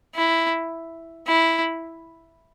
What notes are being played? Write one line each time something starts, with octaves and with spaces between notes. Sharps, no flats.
E4
E4